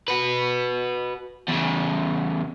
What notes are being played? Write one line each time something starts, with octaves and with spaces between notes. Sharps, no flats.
F#4 B4
E2 C#3